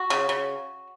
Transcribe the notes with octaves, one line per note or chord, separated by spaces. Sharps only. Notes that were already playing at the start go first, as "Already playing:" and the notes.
Already playing: F#4
C#3
C#3